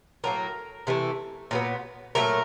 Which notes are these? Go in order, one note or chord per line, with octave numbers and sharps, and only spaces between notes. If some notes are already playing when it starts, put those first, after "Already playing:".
A2 F#3 A#3 A#4
C3 E3 A3
A#2 F#3 B3
A#2 F#3 A3 A#4